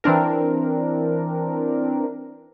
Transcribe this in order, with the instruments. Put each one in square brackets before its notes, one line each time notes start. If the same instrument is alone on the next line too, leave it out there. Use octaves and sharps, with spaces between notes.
[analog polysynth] E3 C4 D4 A#4